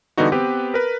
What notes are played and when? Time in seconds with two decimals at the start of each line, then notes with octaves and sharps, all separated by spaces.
0.17 D3 E3 G3 B3 D#4 F#4
0.32 B3 C4 G4 B4
0.74 A#4 B4